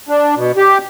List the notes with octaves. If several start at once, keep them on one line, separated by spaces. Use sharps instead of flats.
D4
B2
G4